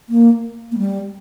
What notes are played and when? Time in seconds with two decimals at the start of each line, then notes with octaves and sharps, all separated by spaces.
0.09 A#3
0.72 A#3
0.78 G3